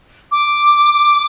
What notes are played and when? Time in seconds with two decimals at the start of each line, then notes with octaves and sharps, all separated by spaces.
0.31 D6